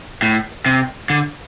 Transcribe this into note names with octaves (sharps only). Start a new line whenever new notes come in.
A2
C3
D3